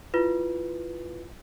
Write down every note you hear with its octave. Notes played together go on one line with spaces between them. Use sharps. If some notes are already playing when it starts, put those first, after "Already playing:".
E4 F4 B4